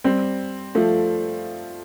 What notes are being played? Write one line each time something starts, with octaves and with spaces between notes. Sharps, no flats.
G3 C4
F3 A3